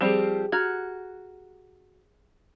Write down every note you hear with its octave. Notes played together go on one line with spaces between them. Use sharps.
F3 G3 C4 G4 G#4
F#4 A#5 F6 G#6